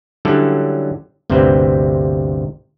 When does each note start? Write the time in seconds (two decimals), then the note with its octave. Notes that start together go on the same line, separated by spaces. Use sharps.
0.25 D3 F#3 G3 C#4 E4 A4
1.30 G1 D2 C3 C4 B4 C5